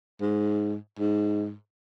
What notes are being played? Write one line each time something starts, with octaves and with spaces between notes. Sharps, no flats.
G#2
G#2